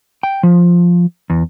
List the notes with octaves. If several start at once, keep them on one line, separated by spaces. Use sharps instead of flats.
G5
F3
E2